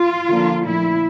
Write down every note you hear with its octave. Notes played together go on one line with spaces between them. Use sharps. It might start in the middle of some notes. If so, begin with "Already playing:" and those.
Already playing: F4
D3 F3 A#3 D4
A#2 F3 A3 E4